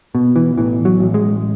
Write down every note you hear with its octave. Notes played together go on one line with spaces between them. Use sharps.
B2
E3
A1 E3
F#3
A1
G#3